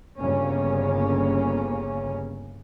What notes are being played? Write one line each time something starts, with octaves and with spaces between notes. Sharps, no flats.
G1 C#3 A#3 C#4